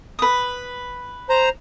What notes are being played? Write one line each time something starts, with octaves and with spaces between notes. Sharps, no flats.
B4 D#6
C5 A#5